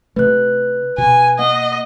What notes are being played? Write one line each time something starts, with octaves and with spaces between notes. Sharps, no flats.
C3 A3 B4 F#6
B2 G#5
A#3 D#5 F#5